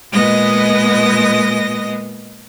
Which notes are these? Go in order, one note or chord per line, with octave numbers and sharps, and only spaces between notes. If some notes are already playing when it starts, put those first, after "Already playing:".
A#2 G#3 B3 D#5 D#6 A#6